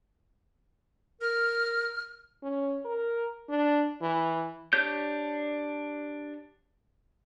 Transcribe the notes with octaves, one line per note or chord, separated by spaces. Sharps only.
A#4 F6
C#4
A#4
D4
E3
D4 G4 C#5 G6